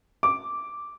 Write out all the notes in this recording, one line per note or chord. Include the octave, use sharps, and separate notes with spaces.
D6